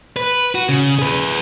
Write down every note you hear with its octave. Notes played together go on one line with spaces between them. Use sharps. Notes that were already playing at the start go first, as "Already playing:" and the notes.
B4
F#4
C#3
G#4 B4